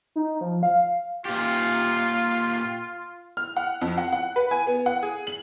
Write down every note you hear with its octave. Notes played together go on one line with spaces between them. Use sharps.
D#4
F3
F5
A#2 F4 G4
F6
F#5
F2
F#5
F#5
B4
G#5
B3
F#5
G#4
F#7